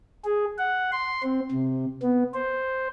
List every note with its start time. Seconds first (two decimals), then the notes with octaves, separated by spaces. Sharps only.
0.25 G#4
0.58 F#5
0.92 C6
1.23 C4
1.52 C3
2.02 B3
2.34 C5